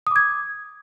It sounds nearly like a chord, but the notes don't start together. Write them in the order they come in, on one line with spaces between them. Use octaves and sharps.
D#6 D6 G#6